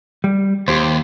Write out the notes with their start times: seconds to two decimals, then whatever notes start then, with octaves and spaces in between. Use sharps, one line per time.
0.24 G3
0.68 D#2 G4 C5